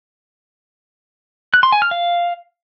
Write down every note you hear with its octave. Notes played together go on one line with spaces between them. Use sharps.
F#6
C6
G#5
F6
F5